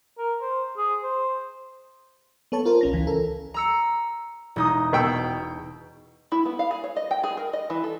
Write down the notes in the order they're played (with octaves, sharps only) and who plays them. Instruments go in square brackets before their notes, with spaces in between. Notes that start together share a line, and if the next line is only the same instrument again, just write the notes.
[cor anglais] A#4
C5
G#4
C5
[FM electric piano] B3 A4 C#5 A5
F4 A#4 C5
A#1 C#4 A#6
C#2 E3
A4 A#4
[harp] A#5 E6 C#7
E1 D#4 D#6
[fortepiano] B2 G5 E6
[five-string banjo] E4
B3
F5
G#4
C#5
D#5
G5
G#4
A#4
D#5
E3
A4